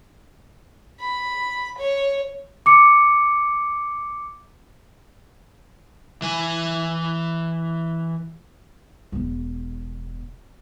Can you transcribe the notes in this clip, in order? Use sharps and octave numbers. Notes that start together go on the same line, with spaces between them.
B5
C#5
D6 C#7
E3 G#5
E1 B3